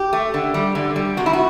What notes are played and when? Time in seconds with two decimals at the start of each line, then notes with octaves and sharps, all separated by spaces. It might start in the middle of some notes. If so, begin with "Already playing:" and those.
Already playing: G4
0.13 A3
0.34 D3
0.54 G3
0.75 D3
0.96 G3
1.17 C3 F#4
1.26 E4
1.33 F#4